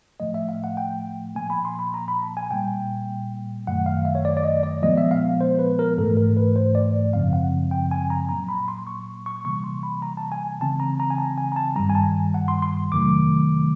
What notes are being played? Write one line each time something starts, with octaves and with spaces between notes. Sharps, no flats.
A2 F3 A3 D#5
E5
F5
F#5
G5
A#2 F3 A#3 G#5
B5
C6
B5
A#5
B5
A5
G#5
A#2 G3 A#3 G5
F#2 D#3 F#3 A3 F#5
F5
E5
C#5
D5
D5
D#5
D5
A#2 F3 G#3 B3 D#5
E5
F5
C5
B4
A#4
G#2 E3 A3 A4
A#4
B4
C5
D5
F#2 C#3 F3 G#3 C4 F5
F#5
G5
G#5
A#5
A#2 F#3 A#3 A#5
B5
C6
C#6
C#6
C3 E3 G3 A#3 C#6
C6
B5
A#5
A5
G#5
C#3 E3 G#3 C4 A5
A#5
A#5
G#5
A5
G#5
A#5
A5
G2 D#3 G3 A#5
G#5
A5
F#5
C6
C6
F2 C3 D#3 F#3 A3 D6